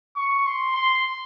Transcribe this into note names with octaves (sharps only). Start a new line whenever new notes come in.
C#6
C6
C6